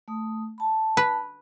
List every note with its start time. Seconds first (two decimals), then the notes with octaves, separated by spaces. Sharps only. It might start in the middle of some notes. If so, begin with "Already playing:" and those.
0.08 A3 D#6
0.58 A5 B5
0.97 B4